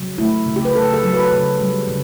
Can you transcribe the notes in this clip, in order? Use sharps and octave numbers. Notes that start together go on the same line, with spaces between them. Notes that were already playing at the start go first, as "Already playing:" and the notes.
Already playing: C#3 F#3
A3 E4
C#3
G4
B4
C#3 A4
A4
F#3
B4
C#3
G3
C#3